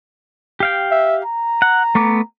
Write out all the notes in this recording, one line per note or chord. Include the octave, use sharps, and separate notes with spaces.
G4 F5 G5
E5
A#5
F#5
A3 B3 D6